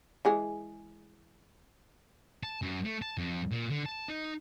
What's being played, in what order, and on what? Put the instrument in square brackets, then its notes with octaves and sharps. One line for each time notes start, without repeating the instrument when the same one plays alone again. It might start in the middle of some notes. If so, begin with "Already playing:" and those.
[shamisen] E3 G#3 G#4
[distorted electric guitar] A5
F#2
A3
A5
F2
A#2
D3
A5
D#4